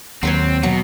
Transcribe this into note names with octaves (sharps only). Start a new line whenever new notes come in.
D#2 F#3 C4 B4 C#5
B2 F#3